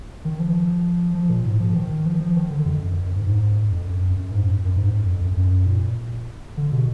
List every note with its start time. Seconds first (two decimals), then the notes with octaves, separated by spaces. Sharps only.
0.25 D#3
0.40 F3
1.15 F3
1.30 A#2
1.45 G#2
1.60 F3
1.75 D#3
2.06 F3
2.20 F3
2.36 D#3
2.51 D3
2.66 F2
2.81 F#2
2.95 F2
3.05 F#2
3.16 G#2
3.26 G#2
3.71 F2
3.86 F#2
4.16 F#2
4.31 G#2
4.46 F#2
4.65 F#2
4.76 G#2
4.92 F#2
5.07 F2
5.21 F#2
5.36 F#2
5.66 A#2
6.57 D3
6.72 B2